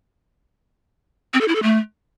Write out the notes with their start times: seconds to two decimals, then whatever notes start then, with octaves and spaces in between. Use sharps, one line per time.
1.34 C4
1.41 A4
1.48 E4
1.55 A4
1.63 A3